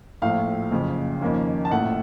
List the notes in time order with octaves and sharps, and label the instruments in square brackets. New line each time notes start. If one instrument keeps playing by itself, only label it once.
[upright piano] A#1 A2 F3 A3 F5
F#1 F2 C#3
F2 D#3 A#3 C#4
A5
A#1 A2 A3 F#5